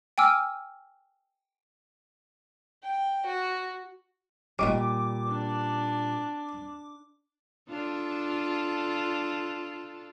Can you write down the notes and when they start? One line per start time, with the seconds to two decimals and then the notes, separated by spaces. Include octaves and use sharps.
0.18 G5 G#5 D6 E6 F6
2.83 G5
3.26 F#4
4.59 A#2 G3 C#4 D#4 F#4 D6
5.28 D4
7.69 D4 F4 A4